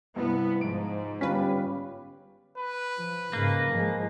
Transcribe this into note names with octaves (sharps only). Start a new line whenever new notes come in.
G2 C3 B3 E4
G#2 F3 D7
G1 G3 C#4 F4 B4 B6
B4
F3
G#2 C#3 A#3
F3 G#3